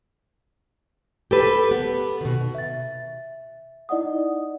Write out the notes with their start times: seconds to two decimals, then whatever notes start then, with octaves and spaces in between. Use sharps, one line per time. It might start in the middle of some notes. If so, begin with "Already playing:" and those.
1.31 G4 A4 B4
1.71 B3
2.21 B2 D#3
2.55 E5 A6
3.89 D#4 E4 D5 D#5 F#5 D#6